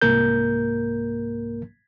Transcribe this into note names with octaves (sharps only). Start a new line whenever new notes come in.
C2 G#2 A#3 A#4 G6